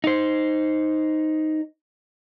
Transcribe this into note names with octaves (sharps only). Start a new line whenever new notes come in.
D#4 C5